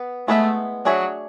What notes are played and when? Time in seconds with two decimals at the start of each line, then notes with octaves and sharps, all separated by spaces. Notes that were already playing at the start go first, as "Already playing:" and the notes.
Already playing: B3 B4
0.28 G#3 A3 B3 E4 B4 E5
0.85 F#3 D4 G#4 C#5 E5